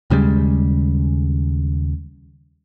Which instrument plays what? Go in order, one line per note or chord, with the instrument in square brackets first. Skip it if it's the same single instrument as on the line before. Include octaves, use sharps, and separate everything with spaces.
[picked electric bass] D#2 C#3 G3 G#3